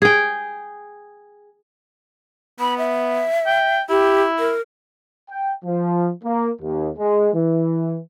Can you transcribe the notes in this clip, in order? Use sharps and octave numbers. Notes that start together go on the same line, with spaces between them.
G#4 G5
B3 B5
E5
G5
E4 G4
A#4
G5
F3
A#3
D#2
G#3
E3